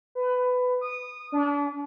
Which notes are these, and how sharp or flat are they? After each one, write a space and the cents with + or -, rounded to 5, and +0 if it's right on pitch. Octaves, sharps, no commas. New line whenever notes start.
B4 +20
D#6 -20
D4 -35